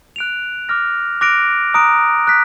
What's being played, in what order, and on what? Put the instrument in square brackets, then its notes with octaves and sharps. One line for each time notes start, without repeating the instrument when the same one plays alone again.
[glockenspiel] F#6 D7 F7
D6 F6 A#6
D6 F#6 A#6 D7 F7
A#5 D#6 F#6 D7
F#6 B6